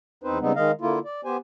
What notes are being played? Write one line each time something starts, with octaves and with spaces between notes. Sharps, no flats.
E2 C4 D#4 B4 C5
C#3 G3 G#3 B3 C4 D#4
D#3 G#3 D#5 F5
D3 A#3 E4 F4
D5
B3 G4 C5 G#5